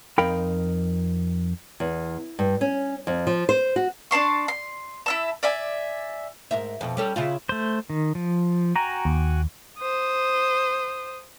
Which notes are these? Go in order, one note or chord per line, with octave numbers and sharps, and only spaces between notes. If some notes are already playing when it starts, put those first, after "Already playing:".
F2 D#4 A#4 F5 G5 B5
E2
G2
C#4
F2
F3
C5
F#4
D4 A5 C6 C#6
C6
E4 E5 A5
D5 E5 G#5
G#2 A#4 E5
F2 B2
G3 C#4 A4
C#3 E4 F4
A3 C5
D#3
F3
F#4 G5 G#5 A#5
D#2
C5 D#6